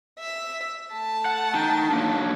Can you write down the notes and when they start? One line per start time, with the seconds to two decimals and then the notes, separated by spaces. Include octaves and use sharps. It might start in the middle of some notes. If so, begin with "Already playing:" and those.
0.19 E5
0.93 A3 A5
1.25 F#5
1.54 D#4 G5
1.91 F#3 A#3 D4